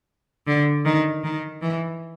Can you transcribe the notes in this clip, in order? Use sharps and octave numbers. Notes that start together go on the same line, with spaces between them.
D3
D#3
D#3
E3